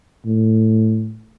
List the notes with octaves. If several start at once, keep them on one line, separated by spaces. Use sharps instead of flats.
A2